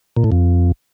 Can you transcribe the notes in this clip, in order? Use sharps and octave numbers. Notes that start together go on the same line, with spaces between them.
A#2
A2
F2